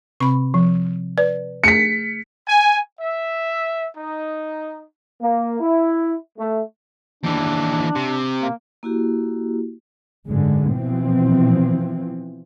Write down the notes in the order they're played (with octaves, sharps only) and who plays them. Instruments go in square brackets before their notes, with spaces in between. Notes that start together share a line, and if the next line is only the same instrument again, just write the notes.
[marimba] C3 C4 [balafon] B5 C#6
[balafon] F3
[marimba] B4 [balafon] D5
[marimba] A3 G#4 [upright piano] B6 C#7
[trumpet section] G#5
E5
D#4
[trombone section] A#3
E4
A3
[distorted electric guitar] D#2 E3 [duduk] D4
[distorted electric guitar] C3
[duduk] A#3
[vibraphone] A#3 E4 F#4 G4
[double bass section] G#1 F#2 D3 G#3
B2 E3 F3 C4